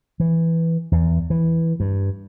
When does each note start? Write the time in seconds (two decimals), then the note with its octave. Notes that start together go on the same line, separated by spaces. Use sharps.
0.20 E3
0.92 E2
1.30 E3
1.80 G2